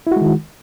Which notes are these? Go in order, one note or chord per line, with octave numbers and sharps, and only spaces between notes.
D#3 G#3 E4 F#4